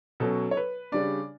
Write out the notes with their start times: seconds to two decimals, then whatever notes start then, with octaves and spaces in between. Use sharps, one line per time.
0.20 B2 F#3 C#4 A4
0.51 C#5
0.57 B4
0.92 C#3 G3 D4 D5